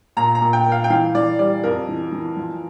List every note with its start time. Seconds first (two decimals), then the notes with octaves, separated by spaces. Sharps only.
0.17 A#2 A#5
0.35 A#5
0.41 A#2
0.53 G5
0.66 A#3
0.72 F5
0.84 G5
0.90 E3 F5
1.15 E3 D5
1.39 G3 D5
1.64 F2 A#4
1.88 E3
2.12 E3
2.36 F3